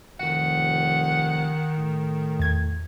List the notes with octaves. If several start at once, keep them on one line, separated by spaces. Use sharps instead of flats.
F1 D#3 F#5
A2
E2 G#6